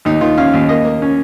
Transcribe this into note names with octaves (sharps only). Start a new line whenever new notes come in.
D#2 D#4
D#3 F4
C#4 F5
D#2
A#3 D#5
A#3
C#4